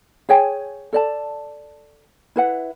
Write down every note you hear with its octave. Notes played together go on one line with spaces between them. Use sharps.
G#4 C#5 G5 G#5
A4 D5 A5
E4 B4 F#5